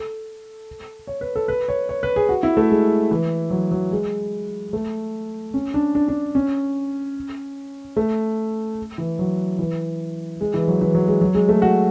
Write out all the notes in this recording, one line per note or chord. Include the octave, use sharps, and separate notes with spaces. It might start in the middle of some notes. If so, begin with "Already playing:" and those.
Already playing: A4
C#5
B4
A4
B4
C#5
C#5
B4
G#4
F#4
E4
A3
G#3
E3
F#3
F#3
G#3
A3
C#4
D4
D4
D4
C#4
A3
E3
F#3
E3
G#3
E3
F#3
E3
F#3
G#3
F#3
G#3
A3
F#4